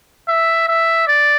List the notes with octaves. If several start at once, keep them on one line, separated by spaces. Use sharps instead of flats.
E5
E5
D5